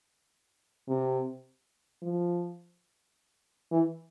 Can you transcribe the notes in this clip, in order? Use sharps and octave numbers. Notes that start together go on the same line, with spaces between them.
C3
F3
E3